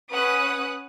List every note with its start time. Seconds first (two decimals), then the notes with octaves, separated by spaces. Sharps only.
0.11 C#4 B4 F#5 D#6 F#6